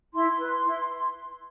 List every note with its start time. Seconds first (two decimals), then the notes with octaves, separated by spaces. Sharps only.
0.14 E4 C6
0.39 B4
0.65 E4